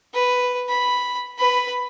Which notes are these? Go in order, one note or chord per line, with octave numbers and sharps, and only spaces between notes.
B4
B5
B4 B5